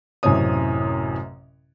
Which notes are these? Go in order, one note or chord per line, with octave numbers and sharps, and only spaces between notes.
A1 F#2 A2 C3 C#5 D#6